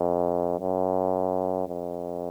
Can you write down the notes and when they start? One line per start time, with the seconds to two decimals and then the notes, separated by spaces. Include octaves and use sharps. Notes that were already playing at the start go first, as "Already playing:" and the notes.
Already playing: F2
0.60 F#2
1.68 F2